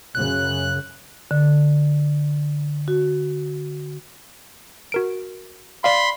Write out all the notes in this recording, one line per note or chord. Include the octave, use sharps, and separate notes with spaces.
F#2 C#3 F#6
D3
F#4
F#4 A#4 D7
D5 F5 B5 C6